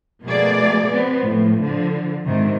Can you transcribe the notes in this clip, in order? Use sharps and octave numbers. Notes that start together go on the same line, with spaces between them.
B2 F3 A3 A#3 G#4 D5
B3 C4
A2 F3
D3 F3
G#2 C3 D#3